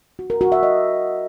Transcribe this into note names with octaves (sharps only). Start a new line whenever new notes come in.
F#4
A#4
F#4
E5
D#5